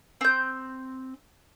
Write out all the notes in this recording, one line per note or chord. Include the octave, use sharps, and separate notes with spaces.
C4 G6